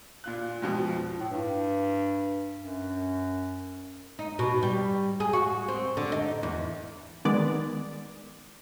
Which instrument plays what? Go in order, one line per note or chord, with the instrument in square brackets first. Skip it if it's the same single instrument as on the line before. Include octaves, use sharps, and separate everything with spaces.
[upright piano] A#2 F4 F#6
F2 G#2 B2 F3
[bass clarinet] A2
G2
F#2
[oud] D#4
B2
G3
G#4
F#4
C4
D3
D#4
E2
[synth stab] D#3 G#3 B3 D5